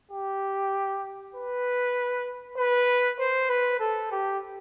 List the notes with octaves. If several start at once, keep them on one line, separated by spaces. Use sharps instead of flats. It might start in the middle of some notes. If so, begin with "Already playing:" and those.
G4
B4
B4
C5
B4
A4
G4